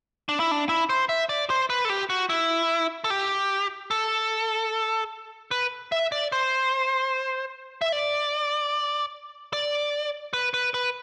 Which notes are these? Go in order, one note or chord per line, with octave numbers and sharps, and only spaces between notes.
D4
E4
D4
E4
C5
E5
D5
C5
B4
A4
G4
F#4
E4
A4
G4
A4
B4
E5
D5
C5
E5
D5
D5
B4
B4
B4